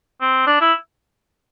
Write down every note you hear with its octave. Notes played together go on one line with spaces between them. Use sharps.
C4
D4
E4